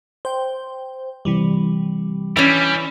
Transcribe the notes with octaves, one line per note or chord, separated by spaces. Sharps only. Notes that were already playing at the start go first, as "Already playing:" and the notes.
C5 G5
C3 E3 G3
E3 G3 C#4